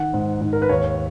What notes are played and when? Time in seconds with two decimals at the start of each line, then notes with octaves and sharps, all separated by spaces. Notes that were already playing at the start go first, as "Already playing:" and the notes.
Already playing: D#3 F#5
0.13 G#2
0.41 G#2
0.53 A#4
0.62 B4
0.69 D#2 C#5